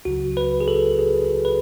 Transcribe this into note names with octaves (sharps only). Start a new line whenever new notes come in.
C#2 C#3 F#3 F#4
B4
G#4
A4
G#4
B4